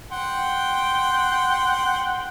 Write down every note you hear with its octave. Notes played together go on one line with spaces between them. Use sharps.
F#5 G5 C6